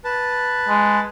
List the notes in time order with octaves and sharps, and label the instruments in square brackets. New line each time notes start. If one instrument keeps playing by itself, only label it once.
[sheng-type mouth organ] B4 A5
[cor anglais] G#3